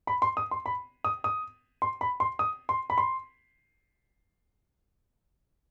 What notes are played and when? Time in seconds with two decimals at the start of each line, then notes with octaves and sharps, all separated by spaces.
0.07 B5
0.22 C6
0.37 D#6
0.51 C6
0.66 B5
1.04 D#6
1.24 D#6
1.82 C6
2.01 B5
2.20 C6
2.39 D#6
2.69 C6
2.90 B5
2.98 C6